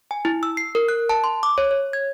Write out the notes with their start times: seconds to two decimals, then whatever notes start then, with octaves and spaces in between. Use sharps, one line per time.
0.11 G#5
0.25 E4
0.43 E6
0.57 C7
0.75 A#4
0.89 F#6
1.09 A5
1.24 C6
1.43 D6
1.58 C#5
1.71 C#5
1.93 G#6